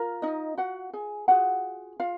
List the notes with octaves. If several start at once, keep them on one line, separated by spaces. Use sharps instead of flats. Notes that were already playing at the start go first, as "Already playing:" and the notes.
Already playing: F4 A#4
D#4 D#5
F#4 F#5
G#4 G#5
F4 F#4 G#4 F#5
F4 F5